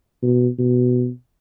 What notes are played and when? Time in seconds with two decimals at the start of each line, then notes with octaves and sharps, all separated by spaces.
0.23 B2
0.59 B2